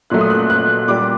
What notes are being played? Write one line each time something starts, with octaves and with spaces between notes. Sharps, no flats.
A#2 F#3 A3 F#6
D#6
F#6
F#6
A#2 G3 D6